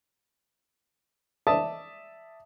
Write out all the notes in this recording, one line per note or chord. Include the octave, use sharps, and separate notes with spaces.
D5 E5 A5 D#6